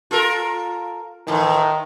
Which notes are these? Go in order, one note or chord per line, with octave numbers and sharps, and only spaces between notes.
F4 A4 A#4
A2 D#3 E3